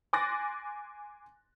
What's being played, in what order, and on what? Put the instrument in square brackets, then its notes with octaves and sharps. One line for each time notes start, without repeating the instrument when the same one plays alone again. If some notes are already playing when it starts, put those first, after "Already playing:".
[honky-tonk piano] G#5 C6 D6 F#6 A6 A#6